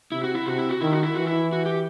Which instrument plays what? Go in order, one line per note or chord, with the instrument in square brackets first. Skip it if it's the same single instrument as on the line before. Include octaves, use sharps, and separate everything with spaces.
[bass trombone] C3 [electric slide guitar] E4
[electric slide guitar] F#4
E4
[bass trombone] C3 [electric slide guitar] F#4
[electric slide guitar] E4
F#4
[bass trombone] D#3 [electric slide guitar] E4
[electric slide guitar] F#4
E4
[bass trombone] E3 [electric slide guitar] F#4
[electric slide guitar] E4
F#4
G4